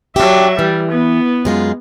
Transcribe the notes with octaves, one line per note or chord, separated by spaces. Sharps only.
F#3 D4 G4 E5
E3 G3
B3
F#2 G#3 F4